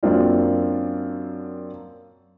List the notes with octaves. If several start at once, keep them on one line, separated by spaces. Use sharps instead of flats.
F#2 F#3 A#3 C4 D4 F4